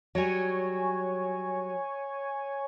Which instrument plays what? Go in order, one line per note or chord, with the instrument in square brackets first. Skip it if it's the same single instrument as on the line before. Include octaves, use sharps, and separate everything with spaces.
[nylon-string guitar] F#3 G3 [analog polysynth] C#5 G#5